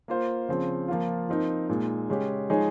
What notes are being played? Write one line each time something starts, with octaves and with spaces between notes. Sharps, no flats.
A#3 F4 C5
C#3 F3 C4
F3 A#3 F4
F3 C4 D#4 A#4
A#2 G#3 D#4
C#3 G#3 C#4 G4
F3 G#3 D#4 G#4 C#5